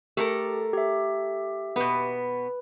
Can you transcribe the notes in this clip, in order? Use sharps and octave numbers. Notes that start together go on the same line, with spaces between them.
A3 G4 A4 A#4
G4 E5
B2 B3 B4